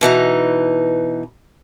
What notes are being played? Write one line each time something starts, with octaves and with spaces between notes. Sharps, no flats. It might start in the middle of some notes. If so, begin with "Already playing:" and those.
B2 E3 D#4 A#5